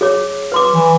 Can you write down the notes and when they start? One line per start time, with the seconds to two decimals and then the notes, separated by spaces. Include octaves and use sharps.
0.01 G#4 C#5 D6
0.52 B4 C6 D6
0.74 E3